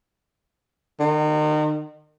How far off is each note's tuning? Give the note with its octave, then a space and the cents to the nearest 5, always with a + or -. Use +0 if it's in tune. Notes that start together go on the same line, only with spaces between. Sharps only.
D#3 -35